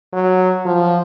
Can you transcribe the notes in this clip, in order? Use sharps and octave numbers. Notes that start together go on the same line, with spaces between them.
F#3
F3